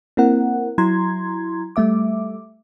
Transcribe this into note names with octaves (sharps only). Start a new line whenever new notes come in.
A#3 C4 E4 A#4 F#5
F#3 E4 A#5 C6 G#6
G3 A3 E5 D6